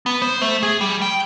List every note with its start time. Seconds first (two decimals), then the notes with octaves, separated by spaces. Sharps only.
0.06 B3
0.22 C5
0.42 A3
0.63 G#4
0.81 G3
1.02 G5